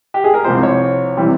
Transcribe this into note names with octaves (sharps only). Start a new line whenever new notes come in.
G4
G#4
A#4
C2 C3 F3 C5
C#5
C3 E3 G3